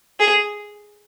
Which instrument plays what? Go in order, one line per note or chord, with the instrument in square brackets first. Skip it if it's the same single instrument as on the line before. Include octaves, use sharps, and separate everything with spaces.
[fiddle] G#4